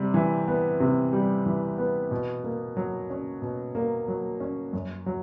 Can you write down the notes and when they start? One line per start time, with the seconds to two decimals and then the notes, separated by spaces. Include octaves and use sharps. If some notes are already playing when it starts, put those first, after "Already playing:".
Already playing: C3 G3
0.14 E3
0.48 B3
0.80 C3
1.13 G3
1.46 E3
1.78 B3
2.11 B2
2.44 A#3
2.77 F#3
3.10 C#4
3.42 B2
3.75 A#3
4.08 F#3
4.40 C#4
4.73 F#2
5.06 F#3